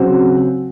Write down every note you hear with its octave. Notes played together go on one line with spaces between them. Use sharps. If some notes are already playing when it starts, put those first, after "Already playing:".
Already playing: C#3 F#3 C4 F#4